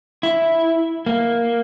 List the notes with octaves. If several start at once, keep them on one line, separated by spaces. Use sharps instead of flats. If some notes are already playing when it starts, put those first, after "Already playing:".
E4
A#3